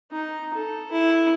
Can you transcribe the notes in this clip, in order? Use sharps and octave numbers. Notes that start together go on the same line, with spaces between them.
D#4
A4
E4